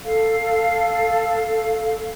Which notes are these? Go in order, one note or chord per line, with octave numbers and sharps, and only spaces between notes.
A4 F5